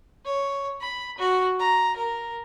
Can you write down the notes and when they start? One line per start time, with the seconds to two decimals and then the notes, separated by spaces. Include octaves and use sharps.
0.25 C#5
0.81 B5
1.18 F#4
1.59 A#5
1.96 A#4